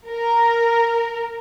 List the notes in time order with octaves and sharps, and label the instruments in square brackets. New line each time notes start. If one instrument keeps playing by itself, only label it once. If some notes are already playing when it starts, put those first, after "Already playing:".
[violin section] A#4